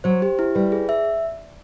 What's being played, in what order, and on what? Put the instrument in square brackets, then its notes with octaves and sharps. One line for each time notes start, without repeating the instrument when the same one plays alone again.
[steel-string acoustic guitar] F#3 [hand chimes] C5
[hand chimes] G4
E4
[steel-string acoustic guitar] G3 [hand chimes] B4
[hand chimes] G#4
E5